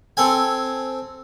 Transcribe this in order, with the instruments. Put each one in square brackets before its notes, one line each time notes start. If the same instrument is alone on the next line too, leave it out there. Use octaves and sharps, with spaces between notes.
[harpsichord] C4 A4 G#5